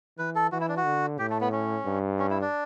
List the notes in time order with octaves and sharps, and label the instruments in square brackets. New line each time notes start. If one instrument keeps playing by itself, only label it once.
[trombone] E3 [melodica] B4
[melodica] A4
[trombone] E3 [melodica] F#4
[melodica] E4
D4
F#4
[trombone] D3
[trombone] A2 [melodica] G4
[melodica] A3
B3
C#4
[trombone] G2
[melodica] C#4
E4
D4